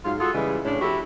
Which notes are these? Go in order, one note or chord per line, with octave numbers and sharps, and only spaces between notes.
G#2 F#3 F4 F5
F4 F#4 G#4 A4
C#3 E3 G3 G#3
A2 C#3 A3 C#4 D4
F2 E4 F#4 G4 A4